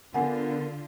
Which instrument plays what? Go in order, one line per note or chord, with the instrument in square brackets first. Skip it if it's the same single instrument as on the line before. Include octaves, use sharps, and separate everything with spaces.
[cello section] D3 F4 [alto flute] B3 [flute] A#4 [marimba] F#5 G#5